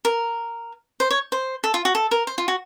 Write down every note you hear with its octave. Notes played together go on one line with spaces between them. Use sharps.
A#4
C5
C#5
C5
A4
F4
F#4
A4
A#4
C5
F4
F#4